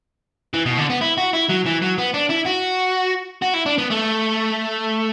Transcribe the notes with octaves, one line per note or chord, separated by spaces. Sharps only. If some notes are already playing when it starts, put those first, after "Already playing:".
E3
B2
D3
B3
E4
F#4
E4
F#3
E3
F#3
B3
D4
E4
F#4
F#4
E4
D4
B3
A3